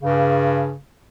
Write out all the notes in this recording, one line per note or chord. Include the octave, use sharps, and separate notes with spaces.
G2 C#3